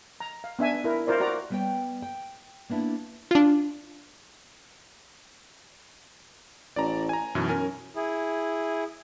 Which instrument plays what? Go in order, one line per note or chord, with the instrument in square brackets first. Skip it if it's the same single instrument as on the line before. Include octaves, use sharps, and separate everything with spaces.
[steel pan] A#5
F5
B3 D4 E5 G#5
E4 A#4
F4 A#4 C5 D5
F#4 D5 A#5
[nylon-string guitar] G3 B3 B4 C#5 G5
G5
A#3 B3 D4 E4
[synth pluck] D4 F4
[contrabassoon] A1 [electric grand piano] D5 A#5
[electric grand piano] G#5 A#5
[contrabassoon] B1 [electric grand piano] F#2 B2 E3
[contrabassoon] F#2 [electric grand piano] A#4 G#5
[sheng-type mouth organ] E4 G#4